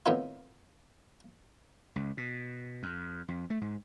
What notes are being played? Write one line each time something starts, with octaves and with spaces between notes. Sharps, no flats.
A2 D#3 B3 C4 D#4 F4
C#2
B2
F2
F2
A3
G#2